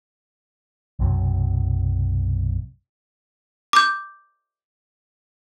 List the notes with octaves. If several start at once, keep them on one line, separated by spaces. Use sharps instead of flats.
B1 F#2 C3 F#3
D6 G6